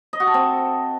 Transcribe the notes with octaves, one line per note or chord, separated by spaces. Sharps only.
D#5
F#4
A4
C4